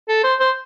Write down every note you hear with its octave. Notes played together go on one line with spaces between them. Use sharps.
A4
C5
C5